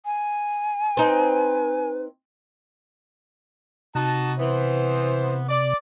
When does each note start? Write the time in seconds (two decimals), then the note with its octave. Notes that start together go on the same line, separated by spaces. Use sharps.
0.05 G#5
0.97 C4 D#4 B4
3.95 C3 D#4 F#4 A5
4.39 E3 B3 C5
5.49 D5